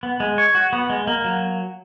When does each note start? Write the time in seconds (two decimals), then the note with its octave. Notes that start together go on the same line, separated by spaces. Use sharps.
0.03 B3
0.20 G#3
0.38 C#5
0.55 F#4
0.73 B3
0.90 G#3
1.07 A#3
1.24 F#3